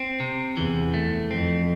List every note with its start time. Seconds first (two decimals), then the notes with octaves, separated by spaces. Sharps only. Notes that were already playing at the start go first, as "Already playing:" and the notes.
Already playing: C4
0.20 C3
0.57 E2 E3
0.94 A3
1.30 F2 C4